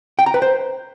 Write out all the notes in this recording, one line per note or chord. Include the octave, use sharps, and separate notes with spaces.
G5
A#5
B4
C5